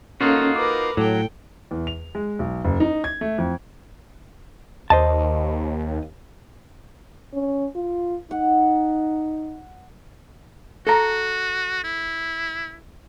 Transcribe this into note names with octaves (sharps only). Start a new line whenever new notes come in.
A#3 C#4 D#4 F4 F#4 A4
A#4 B4 D6
A2 F#3 A4 G5
E2
F7
G#3
B1
F#1
D#4
G#6
A3
F2
D#2 C5 D#5 A5
C#4
F4
D#4 F#5
F#4 A4 A#5
E4